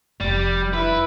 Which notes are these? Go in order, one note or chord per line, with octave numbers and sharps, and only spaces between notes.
F1 G3
E4 B4